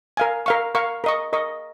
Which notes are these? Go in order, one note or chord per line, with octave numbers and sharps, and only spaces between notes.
A#4 F5 G#5
A#4 F5 C#6
A#4 F5 C#6
A#4 D#5 C#6
A#4 D#5 C#6